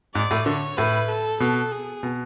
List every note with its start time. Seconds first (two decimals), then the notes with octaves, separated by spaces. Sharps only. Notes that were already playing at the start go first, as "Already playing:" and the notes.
0.15 G#2 D5
0.31 A2
0.46 D3 C#5
0.77 A2 B4
1.08 A4
1.40 B2 A4
1.72 G#4
2.03 B2